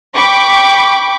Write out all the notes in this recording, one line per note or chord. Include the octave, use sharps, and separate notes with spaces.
G5 B5 C#6 D6